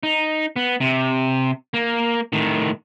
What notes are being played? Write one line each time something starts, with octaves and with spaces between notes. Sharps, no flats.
D#4
B3
C3
A#3
A2 D#3